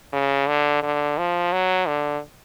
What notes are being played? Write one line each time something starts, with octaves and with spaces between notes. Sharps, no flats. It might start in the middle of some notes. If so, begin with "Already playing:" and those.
C#3
D3
D3
F3
F#3
D3